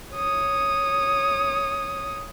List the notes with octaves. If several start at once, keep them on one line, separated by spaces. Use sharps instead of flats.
C#5 D#6